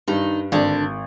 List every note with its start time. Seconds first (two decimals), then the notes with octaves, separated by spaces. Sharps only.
0.08 G2 D#3 D#4
0.52 G#1 D3 D4